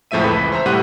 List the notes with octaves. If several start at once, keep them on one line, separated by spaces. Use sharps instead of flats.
F2 A2 F3 G#3 E5 D#7
C#2 E3 B4 B5 B6
C5 E5 A#5
A2 C3 G3 F#5 F#6 D#7